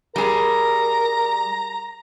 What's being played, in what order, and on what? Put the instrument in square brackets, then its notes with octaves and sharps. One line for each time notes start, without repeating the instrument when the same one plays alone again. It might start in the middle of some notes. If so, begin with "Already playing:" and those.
[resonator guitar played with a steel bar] G3 G#4 [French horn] A#4 [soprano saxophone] A#5